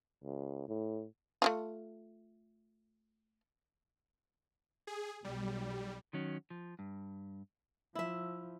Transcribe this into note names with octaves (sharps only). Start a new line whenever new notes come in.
C#2
A2
A3 E4 F4
G#4
B1 G3
D#3 F#3 C#4
F3
G2
F3 E4 E5